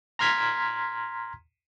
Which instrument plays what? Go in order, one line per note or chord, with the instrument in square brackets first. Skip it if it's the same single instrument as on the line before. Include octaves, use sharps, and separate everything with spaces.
[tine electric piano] A#5 C6 F6 G#6 B6